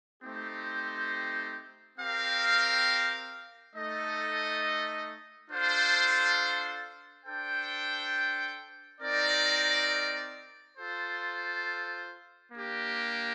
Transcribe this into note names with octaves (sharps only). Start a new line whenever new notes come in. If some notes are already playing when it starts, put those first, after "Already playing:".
A3 C4 D#4 G4 C5
C4 G4 A#4 F5
A3 D#4 A4 D#5
D4 F4 A4 C5 F5
D4 A4 C5 G5
C4 D#4 A#4 D5
F4 A4 C5
A#3 D4 G4